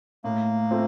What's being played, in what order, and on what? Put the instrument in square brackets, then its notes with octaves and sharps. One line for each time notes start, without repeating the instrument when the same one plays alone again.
[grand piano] A2 [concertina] A#3
[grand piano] A3 C4 F4